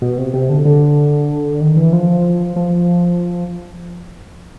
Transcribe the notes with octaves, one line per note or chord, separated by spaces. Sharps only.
B2
C3
C3
D3
D3
D#3
E3
F3
F3